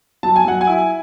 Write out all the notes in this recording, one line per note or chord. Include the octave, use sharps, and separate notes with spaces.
F#3 A5
G#5
F#3 F#5
G#5
E4